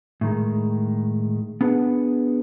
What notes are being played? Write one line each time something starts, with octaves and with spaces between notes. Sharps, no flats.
A2 D#3 G#3
B3 D4 G#4 B4 F#5